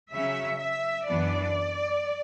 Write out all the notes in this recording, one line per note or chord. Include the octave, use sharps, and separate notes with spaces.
C#3 F#3 C#4 E5
E5
F#2 E3 B3 D4 D5